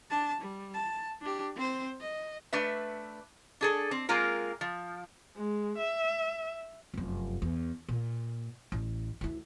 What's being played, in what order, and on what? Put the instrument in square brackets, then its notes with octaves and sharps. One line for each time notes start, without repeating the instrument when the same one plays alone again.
[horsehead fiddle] D4 A5
G3
A5
D4 G4
C4 C5
D#5
[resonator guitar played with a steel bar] A3 D4 B4 E5
D4 G#4 A4
C4
G#3 A#3 C4 F4 A#4
F3
[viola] G#3
E5
[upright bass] F1 F#2
E2
A#2
A1
D2 E4